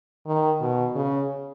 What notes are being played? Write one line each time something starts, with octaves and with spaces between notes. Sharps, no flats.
D#3
B2
C#3